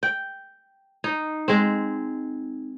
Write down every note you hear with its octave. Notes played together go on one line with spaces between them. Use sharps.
G5
D#4
G#3 C4